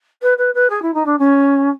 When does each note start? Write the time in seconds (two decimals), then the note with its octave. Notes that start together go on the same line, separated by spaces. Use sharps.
0.22 B4
0.38 B4
0.54 B4
0.70 G#4
0.82 E4
0.94 D#4
1.06 D4
1.18 C#4